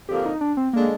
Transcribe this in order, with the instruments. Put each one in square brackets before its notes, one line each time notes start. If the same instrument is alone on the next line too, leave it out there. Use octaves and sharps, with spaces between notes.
[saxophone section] F2 D3 F3 A#3 [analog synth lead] G4
[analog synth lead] D#4
D4
C4
[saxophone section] D3 G#3 D4 [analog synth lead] A#3